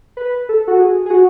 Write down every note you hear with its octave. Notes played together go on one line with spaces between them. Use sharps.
B4
A4
F#4
G#4
G#4
F#4